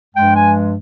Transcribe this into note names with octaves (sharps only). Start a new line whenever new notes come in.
G2 F3 G#3 G5
G#5